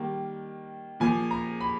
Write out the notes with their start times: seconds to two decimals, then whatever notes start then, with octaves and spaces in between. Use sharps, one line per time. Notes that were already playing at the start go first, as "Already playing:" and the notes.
Already playing: D#3 G3 A#3
1.00 A#2 F3 A#3 G#5
1.31 A#5
1.61 B5